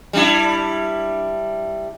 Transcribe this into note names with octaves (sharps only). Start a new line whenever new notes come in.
G3 D4 E4